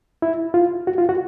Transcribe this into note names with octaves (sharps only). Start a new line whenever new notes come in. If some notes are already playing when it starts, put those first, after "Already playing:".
E4
F4
F#4
F4
F#4